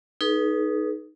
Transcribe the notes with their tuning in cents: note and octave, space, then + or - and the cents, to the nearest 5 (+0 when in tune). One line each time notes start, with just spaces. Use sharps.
D#4 +0 G#4 +35 B4 -20